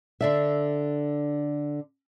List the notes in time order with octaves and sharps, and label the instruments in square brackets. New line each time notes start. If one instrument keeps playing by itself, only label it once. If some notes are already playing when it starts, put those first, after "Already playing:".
[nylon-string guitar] D3 D4 E5